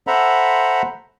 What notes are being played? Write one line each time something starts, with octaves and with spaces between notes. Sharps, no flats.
A4 C5 E5 F#5 A#5 B5